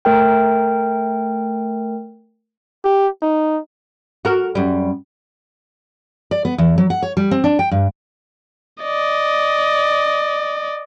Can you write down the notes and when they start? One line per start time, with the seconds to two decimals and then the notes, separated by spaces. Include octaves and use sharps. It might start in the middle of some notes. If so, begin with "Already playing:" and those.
0.05 A3 A#4 G5
2.84 G4
3.23 D#4
4.25 F#4 A#4
4.55 F#2 G3
6.31 D5
6.45 B3
6.58 E2
6.78 F#3
6.90 F#5
7.03 C#5
7.17 G3
7.31 C4
7.44 D4
7.59 G5
7.71 G2
8.83 D5 D#5